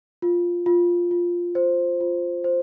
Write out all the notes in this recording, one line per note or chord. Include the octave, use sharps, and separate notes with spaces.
F4
F4
F4
C5
F4
C5